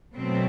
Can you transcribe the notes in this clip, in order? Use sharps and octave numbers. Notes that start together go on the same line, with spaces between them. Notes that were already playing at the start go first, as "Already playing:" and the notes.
B2 F#3 A3 C4